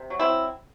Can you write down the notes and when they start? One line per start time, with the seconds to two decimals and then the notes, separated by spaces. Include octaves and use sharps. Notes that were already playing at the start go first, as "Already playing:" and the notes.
Already playing: C3
0.10 F#3
0.19 C4 E4